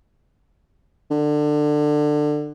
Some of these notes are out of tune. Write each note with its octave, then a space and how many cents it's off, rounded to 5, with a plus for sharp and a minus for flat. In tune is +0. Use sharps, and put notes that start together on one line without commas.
D3 +20